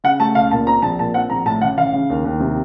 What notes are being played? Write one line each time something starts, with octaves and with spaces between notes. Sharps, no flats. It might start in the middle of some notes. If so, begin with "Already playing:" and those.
C#3 F#5
A3 A5
C#2 F5
A#2 A5
C4 A#5
A#1 A5
A#2 A5
C4 F#5
A#1 A#5
A2 A5
A1 F#5
A1 F5
C#3
D#2
D#2
C3